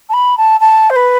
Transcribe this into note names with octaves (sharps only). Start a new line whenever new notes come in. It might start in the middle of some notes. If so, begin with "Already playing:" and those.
A5
B5
A5
A5
C5
B4